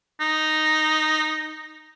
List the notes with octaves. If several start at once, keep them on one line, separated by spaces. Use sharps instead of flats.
D#4